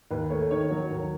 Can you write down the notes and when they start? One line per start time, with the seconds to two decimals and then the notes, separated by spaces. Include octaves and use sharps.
0.11 D#2 B4
0.30 A3 C#5
0.50 D#3 C#5
0.71 F#3
0.91 D#2